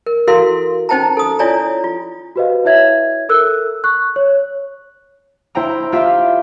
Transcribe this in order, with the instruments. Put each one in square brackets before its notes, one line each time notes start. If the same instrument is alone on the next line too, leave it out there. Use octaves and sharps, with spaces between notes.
[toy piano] A#4
E4 F#4 A4 A#4 F5 C6
C#4 D#4 C5 G5 A5 A#5
A4 D#6
E4 F4 C#5 D5 G#5 A#5
F4
[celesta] F#4 G4 B4 C5 D#5 F5
E4 C#5 E5 G#6
A4 A#4 E6 F#6
C#6 F#6
C#5
[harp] E4 C5 G5 A#5 C6
F4 G4 E5 F5